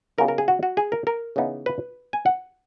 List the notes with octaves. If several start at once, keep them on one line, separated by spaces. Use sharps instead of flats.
C#3 F#3 B3 D#4 A#4
A#4
G#4
F#4
F#4
G#4
A#4
A#4
C#3 E3 B3 D#4
B4
G#5
F#5